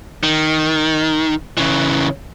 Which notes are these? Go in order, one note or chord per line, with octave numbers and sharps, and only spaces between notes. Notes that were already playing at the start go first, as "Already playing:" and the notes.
D#3
C#3 E3